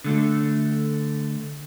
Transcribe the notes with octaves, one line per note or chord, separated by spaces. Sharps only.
D3 A3